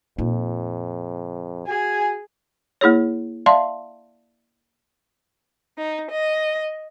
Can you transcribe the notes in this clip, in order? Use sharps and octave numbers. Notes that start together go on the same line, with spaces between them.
F2 A#2 D#4
F#4 G#4 G#5
A#3 E4 G#4 C#5
D5 E5 F5 A5 C6
D#4
D#5